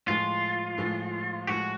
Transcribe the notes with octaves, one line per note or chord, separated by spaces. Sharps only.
A2 F3 G#3 F4
A2 F3 G#3
A2 F3 G#3 F#4